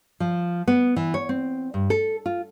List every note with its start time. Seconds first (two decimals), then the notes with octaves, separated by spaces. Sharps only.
0.20 F3
0.68 B3
0.96 E3
1.14 C#5
1.29 C4
1.74 G2
1.90 A4
2.26 F4